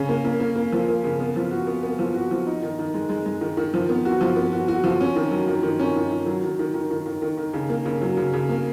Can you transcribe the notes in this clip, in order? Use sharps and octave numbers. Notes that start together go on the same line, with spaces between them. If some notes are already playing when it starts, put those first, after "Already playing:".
Already playing: C#3 C#4
A#3
A#3
A#3
A#3
F3
A#3
C#3
B3
F3
F#4
B3
B3
F3
F#4
F3
D#4
D#3
D#3
G#3
G#3
G#3
D#3
D#3
F3
B3
F#4
F3
B3
F#4
F#4
F3
C#4
D#3
F#3
D#3
D#3
C#4
D#3
D#3
F#3
D#3
D#3
D#3
D#3
D#3
D#3
D#3
C#3
A#3
C#3
F#3
C#3
C#3
A#3